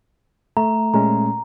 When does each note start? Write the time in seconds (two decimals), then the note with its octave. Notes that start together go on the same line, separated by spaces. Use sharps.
0.57 A3 A#5
0.94 A#2 G#3 C#4 A#5